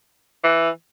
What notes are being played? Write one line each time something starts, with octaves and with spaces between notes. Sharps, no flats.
E3